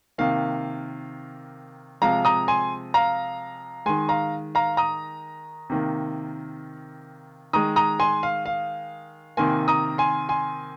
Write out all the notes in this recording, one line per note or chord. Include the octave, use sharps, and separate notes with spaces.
C3 D#3 A#3 F5
C3 F3 G#3 F5 A#5
A#5 D#6
G#5 C6
F5 A#5
D#3 G#3 G#5 C6
F5 A#5
F5 A#5
A#5 D#6
C3 D#3 A#3
D#3 G#3 A#5 D#6
A#5 D#6
G#5 C6
F5
F5
C3 D#3 A#3 G#5 C6
A#5 D#6
G#5 C6
G#5 C6